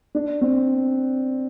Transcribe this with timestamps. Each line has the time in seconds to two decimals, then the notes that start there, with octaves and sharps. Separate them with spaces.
0.15 D4
0.41 C4